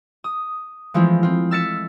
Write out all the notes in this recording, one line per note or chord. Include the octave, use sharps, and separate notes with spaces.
D#6
E3 F3 G#3 A3 C4 F4
C4 F4
E6 F6 A6 B6 C#7 E7